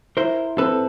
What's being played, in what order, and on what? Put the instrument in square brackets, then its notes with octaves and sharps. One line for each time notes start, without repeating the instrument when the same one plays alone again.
[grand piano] E4 [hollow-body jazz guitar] A#4 C5
[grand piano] C4 [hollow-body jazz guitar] A4 B4